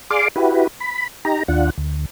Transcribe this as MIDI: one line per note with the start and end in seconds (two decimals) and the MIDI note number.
0.10 0.28 68
0.10 0.28 74
0.10 0.28 77
0.10 0.28 84
0.10 0.28 86
0.36 0.67 64
0.36 0.67 66
0.36 0.67 67
0.36 0.67 71
0.80 1.08 83
1.25 1.43 63
1.25 1.43 67
1.25 1.43 82
1.48 1.70 39
1.48 1.70 62
1.48 1.70 65
1.48 1.70 78
1.78 2.05 38